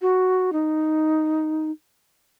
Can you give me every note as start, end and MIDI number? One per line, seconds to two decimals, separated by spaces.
0.01 0.50 66
0.52 1.71 63